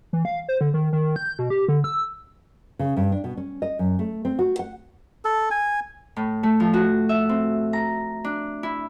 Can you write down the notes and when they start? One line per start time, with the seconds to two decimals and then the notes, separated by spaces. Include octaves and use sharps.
0.13 E3
0.25 F5
0.49 C5
0.61 D3
0.74 D#3
0.93 D#3
1.16 G6
1.39 B2
1.50 G4
1.68 D3
1.84 E6
2.79 C#3
2.97 G2
3.12 D4
3.24 B2
3.37 C#4
3.62 D#5
3.79 F#2
3.99 A3
4.25 C4
4.39 F#4
4.59 F#5
5.25 A4
5.51 G#5
6.16 A2
6.43 A3
6.60 F3
6.74 F#4
7.09 E5
7.29 C4
7.73 A#5
8.25 D4
8.63 E4